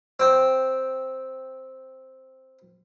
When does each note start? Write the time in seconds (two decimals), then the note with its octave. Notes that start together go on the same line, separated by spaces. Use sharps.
0.20 C4 G5